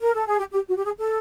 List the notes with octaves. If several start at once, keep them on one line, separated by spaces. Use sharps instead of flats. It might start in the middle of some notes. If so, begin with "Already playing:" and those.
A#4
A4
G#4
G4
G4
F#4
G4
G#4
A4